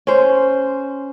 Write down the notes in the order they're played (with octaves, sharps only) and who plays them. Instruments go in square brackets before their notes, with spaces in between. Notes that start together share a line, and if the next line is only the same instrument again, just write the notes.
[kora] C#4 C5